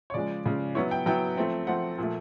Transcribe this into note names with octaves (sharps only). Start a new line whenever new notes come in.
C#5
C#3 F3 G#3 D5
C#3 F3 G#3
F#3 B3 E4 C#5
G5
F#3 B3 E4 G5
F3 A3 C4
F3 A3 C4 F#5
A#2 F3 A3